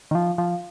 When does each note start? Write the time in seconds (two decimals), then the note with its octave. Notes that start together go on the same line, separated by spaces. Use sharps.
0.11 D#3
0.15 F3
0.38 F3